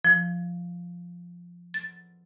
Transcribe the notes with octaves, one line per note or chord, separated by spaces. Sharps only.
F3
A6